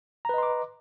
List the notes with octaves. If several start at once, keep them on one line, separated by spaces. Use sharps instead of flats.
B4 D#5 A#5 C6 D6